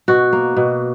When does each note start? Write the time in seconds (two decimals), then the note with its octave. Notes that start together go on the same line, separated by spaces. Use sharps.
0.08 B2 F#4
0.33 A#3
0.57 B2